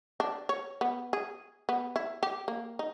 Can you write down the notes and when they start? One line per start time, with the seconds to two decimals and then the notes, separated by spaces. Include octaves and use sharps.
0.20 D4
0.49 C#5
0.81 B3
1.13 G#4
1.69 B3
1.96 E4
2.23 G4
2.48 A#3
2.79 D#4